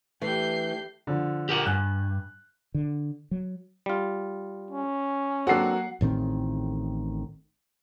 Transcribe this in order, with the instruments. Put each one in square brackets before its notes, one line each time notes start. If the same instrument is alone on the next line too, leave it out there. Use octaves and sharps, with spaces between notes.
[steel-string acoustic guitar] E3 [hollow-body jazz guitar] A3 [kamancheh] D4 G4 [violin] G6 C7
[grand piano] D3 F3
[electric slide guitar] G4 A#4 F#5
[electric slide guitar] G2 [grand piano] G#5 F#6
[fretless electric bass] D3
F#3
[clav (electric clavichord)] G3 F4
[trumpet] C#4
[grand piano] F#3 A#3 F#4 [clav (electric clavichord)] C4 D4 A4 [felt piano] F#5 C7
[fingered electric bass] A1 A2 D#3 C4